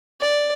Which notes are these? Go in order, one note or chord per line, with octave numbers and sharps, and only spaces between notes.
D5